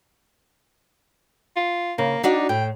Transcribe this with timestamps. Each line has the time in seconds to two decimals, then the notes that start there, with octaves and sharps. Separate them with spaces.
1.56 F4
1.98 C#3 A#3
2.23 D4 D#4 F#4 D5
2.49 A2 G5